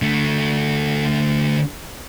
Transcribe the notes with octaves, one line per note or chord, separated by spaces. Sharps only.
D3 A3